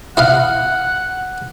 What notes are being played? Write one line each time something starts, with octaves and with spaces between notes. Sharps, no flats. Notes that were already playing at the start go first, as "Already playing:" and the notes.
E4 D#5 F5 F#5